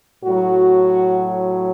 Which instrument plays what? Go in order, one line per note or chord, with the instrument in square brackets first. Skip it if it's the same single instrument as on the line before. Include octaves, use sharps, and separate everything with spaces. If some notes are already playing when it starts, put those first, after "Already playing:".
[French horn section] A2 F#3 F#4